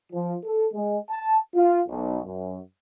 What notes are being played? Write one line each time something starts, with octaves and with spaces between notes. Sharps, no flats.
F3
A4
G#3
A5
F4
B1
F#2